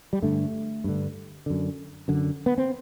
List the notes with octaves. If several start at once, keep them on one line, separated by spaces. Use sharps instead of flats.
G3
G2 D3 A3
G2 D3
F#2 D3
F#2 D3
B3
C4